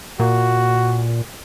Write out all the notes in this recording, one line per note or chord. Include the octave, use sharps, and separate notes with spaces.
A#2 F#4